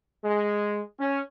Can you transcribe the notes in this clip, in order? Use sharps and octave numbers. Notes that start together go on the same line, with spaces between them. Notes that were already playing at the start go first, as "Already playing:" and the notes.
G#3
C#4